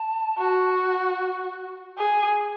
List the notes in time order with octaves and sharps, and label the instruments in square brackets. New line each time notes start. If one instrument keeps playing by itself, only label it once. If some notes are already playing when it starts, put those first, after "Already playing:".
Already playing: [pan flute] A5
[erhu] F#4
G#4